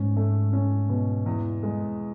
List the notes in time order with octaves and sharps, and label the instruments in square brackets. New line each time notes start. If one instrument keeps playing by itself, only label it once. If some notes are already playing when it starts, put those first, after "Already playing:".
Already playing: [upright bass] G#2 [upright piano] C#4
[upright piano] A3
C#4
B2
E2
G#3